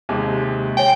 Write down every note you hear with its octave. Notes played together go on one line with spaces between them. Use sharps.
D#2 C3 G#3
C#5 G5 G#5